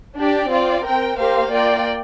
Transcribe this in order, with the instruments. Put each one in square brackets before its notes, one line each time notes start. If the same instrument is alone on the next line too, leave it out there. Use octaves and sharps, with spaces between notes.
[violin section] D4 G4 D5
C4 F4 D5
C4 A#4 G5
A#3 G4 C5 F5
A#3 F4 D5 G5